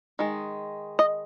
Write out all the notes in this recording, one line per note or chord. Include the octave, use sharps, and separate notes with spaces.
D#3 G#3
D#5